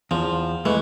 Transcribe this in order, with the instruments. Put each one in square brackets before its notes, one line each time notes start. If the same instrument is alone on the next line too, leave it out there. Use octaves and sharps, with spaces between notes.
[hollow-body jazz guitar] E2 [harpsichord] F3
[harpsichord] E3 [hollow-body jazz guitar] G#3 A3